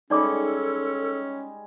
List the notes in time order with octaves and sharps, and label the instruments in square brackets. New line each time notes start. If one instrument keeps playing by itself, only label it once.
[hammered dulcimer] G3 G#3 [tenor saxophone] C#4 [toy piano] D#4 D5 D6 [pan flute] A4